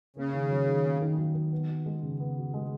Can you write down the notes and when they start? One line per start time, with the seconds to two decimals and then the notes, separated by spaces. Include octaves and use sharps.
0.16 C#3 A#3
0.33 D#3
0.51 F#3
0.67 D#3
0.84 A#3
1.02 D#3
1.18 F#3
1.35 D#3
1.52 B3
1.69 F#4
1.86 G#3
2.03 C#3
2.20 B3
2.37 F#4
2.54 G#3